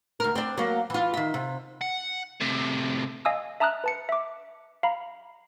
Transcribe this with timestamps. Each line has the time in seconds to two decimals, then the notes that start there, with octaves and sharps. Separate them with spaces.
0.20 D2 A#4
0.35 C4 D4
0.58 F#3 A#3
0.90 E3 F4
1.14 D#3 E5
1.34 C3
1.81 F#5
2.40 A2 C3
3.25 D#5 F5 G#5 D#6 E6
3.60 E5 A5 A#5 D#6 F6 F#6
3.84 B4 A5 C#7
4.09 E5 D6
4.83 F5 A#5 B5